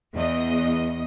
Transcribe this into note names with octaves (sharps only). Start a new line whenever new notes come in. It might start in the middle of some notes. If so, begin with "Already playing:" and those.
E2 D#5